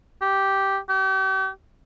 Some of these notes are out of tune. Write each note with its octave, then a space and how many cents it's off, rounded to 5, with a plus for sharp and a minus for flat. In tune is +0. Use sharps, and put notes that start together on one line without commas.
G4 -5
G4 -40